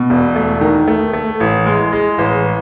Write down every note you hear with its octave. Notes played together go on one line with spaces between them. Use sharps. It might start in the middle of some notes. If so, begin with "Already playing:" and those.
Already playing: B2
E1
A3
D#3
A3
A3
A1
G#3
G#3
A1